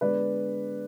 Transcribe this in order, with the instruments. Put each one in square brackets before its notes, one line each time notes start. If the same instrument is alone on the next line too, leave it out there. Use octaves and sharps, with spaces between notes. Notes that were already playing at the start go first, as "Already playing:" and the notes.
[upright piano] D3 G#3 B3 B4 D5